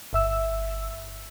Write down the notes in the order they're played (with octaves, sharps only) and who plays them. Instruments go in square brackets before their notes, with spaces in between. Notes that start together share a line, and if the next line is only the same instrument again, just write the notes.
[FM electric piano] G1 E5 E6